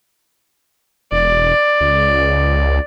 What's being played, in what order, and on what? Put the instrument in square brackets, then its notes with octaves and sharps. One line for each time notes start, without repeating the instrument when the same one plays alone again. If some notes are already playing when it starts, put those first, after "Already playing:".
[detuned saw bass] E1 [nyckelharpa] D5
[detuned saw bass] C#2